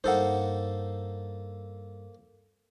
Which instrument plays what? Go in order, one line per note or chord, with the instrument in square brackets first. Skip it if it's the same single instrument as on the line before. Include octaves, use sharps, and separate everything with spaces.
[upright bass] G2 [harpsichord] A#3 A4 C5 [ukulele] D#4 F#5